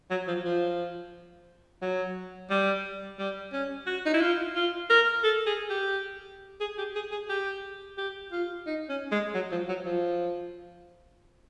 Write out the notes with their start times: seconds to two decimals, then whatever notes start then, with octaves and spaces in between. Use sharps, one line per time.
0.11 F#3
0.28 F3
0.45 F3
1.82 F#3
2.50 G3
3.19 G3
3.53 C#4
3.87 F#4
4.06 D#4
4.14 E4
4.21 F4
4.56 F4
4.90 A#4
5.24 A4
5.46 G#4
5.70 G4
6.61 G#4
6.78 G4
6.95 G#4
7.12 G#4
7.29 G4
7.98 G4
8.32 F4
8.66 D#4
8.89 C#4
9.12 G#3
9.34 F#3
9.52 F3
9.69 F#3
9.86 F3